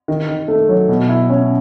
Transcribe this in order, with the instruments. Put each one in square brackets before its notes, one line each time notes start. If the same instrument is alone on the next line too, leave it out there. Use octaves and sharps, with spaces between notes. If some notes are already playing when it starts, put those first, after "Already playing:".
[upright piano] D#3
D#3
A3
F#3
B2
E4
C#4